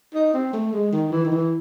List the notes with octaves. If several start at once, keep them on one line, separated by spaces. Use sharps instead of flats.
D#4
C4
A3
G#3
D#3
E3
D#3
E3